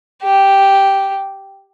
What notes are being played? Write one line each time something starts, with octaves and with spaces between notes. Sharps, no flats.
G4